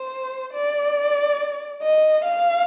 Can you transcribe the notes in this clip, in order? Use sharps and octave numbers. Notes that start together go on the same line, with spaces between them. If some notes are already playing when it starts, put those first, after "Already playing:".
Already playing: C5
D5
D#5
F5